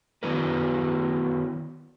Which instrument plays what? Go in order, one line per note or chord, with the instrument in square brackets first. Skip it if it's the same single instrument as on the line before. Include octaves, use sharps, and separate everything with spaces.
[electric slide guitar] D#3 F#3 B3 E4 A#4 B4